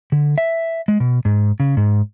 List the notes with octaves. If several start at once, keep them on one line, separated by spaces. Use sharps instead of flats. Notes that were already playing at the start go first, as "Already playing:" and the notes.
D3
E5
G#3
B2
G#2
C#3
G#2